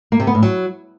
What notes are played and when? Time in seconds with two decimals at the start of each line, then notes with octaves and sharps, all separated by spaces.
0.12 A#3
0.20 C3
0.27 B3
0.35 A2
0.43 F#3